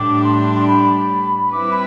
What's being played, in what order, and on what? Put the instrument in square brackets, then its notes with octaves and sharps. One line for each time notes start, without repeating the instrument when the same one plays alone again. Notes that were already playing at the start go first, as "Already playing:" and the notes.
Already playing: [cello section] A2 G3 D4 G4 D5 [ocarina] D6
[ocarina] C6
C6
B5
[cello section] G3 C4 E4 B4 [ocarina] D6
[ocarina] B5